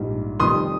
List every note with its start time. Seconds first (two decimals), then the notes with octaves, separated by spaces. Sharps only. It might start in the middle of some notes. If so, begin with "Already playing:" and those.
Already playing: A#1 G#2 G3
0.40 F1 F2 D#3 G3 C6 D#6